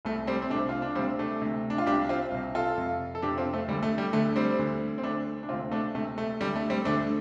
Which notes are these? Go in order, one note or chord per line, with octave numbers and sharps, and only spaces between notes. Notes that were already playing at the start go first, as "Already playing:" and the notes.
C2 C3 A3
G3 C4
C4
C2 C3 A3 D4
F4
D4
D2 C3 G3 C4
A3 D4
D2 C3
D4
F4
C2 C3 D4 G4
C4 F4
C2 C3
F4 A4
F2 C3
A4
F2 C3 D4 G4
C4 F4
A3
D2 D3 G3
A3
G3
D2 D3 A3
G3 C4
D2 D3
C4
D2 D3 A3 D4
D4
D2 C3 C4 F4
A3 D4
D2 C3 A3
A3
D2 D3 G3
A3
G3 C4
D2 D3 A3 D4